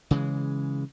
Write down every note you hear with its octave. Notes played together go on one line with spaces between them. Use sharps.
C#3 E3 G#3